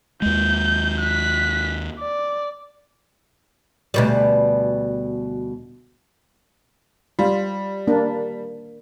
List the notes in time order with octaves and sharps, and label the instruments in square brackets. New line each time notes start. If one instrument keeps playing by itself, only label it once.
[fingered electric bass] D#2 G#3 [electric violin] G6
[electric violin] F#6 B6
D5
[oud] D2 B2 G3
[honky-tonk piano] G3 [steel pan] F4
[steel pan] A#3 D4